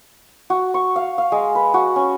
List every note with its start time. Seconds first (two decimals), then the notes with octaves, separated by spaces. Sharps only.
0.50 F#4
0.74 C#6
0.96 F5
1.18 F5
1.32 G#3
1.55 B4
1.74 F#4
1.96 C#4